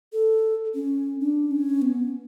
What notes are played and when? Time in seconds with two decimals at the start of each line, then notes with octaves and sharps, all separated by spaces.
0.13 A4
0.74 C#4
1.20 D4
1.51 C#4
1.82 B3